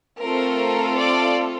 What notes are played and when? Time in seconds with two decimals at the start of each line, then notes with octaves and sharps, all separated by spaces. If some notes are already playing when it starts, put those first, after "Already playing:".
0.21 A3 C4 F4 A4 A#4
0.99 D5